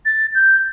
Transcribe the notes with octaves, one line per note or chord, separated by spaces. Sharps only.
A6
G6